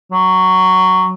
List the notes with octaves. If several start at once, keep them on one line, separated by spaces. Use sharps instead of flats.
F#3